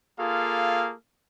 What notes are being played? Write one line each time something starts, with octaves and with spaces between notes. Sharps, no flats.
A#3 F4 G#4 A4 F5